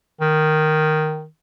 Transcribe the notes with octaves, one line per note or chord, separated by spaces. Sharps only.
D#3